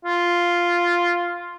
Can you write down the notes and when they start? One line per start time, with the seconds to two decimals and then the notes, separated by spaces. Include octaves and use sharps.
0.05 F4